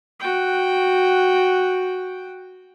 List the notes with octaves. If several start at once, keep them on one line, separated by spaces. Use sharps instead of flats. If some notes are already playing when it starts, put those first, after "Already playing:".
F#4 G5